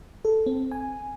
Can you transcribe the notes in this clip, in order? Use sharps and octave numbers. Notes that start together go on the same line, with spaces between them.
A4
C4
G#5